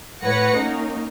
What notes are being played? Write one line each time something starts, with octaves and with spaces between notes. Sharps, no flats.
A2 B4 C#5 F#5 A#6 C#7
A#3 C#4 D#4